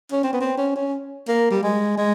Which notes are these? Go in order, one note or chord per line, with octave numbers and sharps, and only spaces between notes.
C#4
C4
B3
C4
C#4
C#4
A#3
G3
G#3
G#3